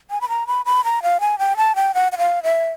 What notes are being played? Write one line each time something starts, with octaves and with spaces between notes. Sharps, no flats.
G#5
B5
A#5
B5
B5
A#5
F5
G#5
G5
A5
G5
F#5
F#5
F5
E5